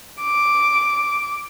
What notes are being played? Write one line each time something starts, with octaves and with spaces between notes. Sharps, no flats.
D6